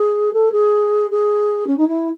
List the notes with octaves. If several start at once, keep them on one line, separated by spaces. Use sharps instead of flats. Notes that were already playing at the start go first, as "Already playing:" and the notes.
Already playing: G#4
A4
G#4
G#4
C#4
D#4
E4